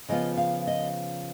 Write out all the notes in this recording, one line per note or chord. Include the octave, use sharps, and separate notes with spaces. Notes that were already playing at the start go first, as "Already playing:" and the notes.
C#3 F3 B3 F4 D#5
F5
D#5